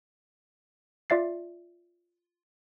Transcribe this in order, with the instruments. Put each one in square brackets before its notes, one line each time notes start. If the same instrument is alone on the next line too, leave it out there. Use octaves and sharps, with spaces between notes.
[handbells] F4 D5 E5 A6 C7